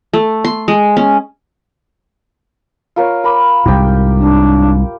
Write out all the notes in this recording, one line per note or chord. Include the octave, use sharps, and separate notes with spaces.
A3
C6
G#3
C#4
F4 A#4 C#5
A#4 B5 D6
C2 G#2 G4 G5
D4